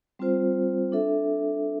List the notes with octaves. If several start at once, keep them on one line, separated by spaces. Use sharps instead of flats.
G3 C4 F4 C5
D4 A4 E5